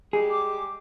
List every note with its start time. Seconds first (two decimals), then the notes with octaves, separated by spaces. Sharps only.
0.13 G3 G#3 G4 G#4
0.30 D6